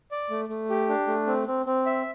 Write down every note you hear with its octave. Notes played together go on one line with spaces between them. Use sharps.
D5
A3
A3
G4
D4
A3
C4
C4
C4
E5